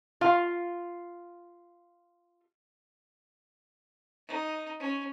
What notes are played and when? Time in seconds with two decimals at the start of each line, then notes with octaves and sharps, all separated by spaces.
0.21 F4 F5
4.27 D#4
4.80 C#4